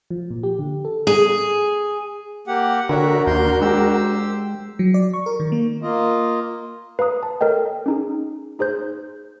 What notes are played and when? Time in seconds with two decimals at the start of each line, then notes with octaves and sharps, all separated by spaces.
0.11 F3
0.31 A#2
0.43 G4
0.59 D3
0.85 A4
1.07 G#4
2.47 A#3 G4 F#5
2.89 D3 D4 F#4 A#4 C#5 E5
3.27 D#2 A#3 C6 G6
3.61 G#3 G4 C5 E6
4.79 F#3
4.94 D5
5.14 C#6
5.26 A#4
5.40 D#3
5.52 A#3
5.82 A#3 F4 D#5
6.99 B4 F5 A#5 D#6
7.23 A5
7.41 A4 A#4 C#5 D#5 G5
7.86 C#4 D#4 G#4
8.59 D#4 G#4 C5 G6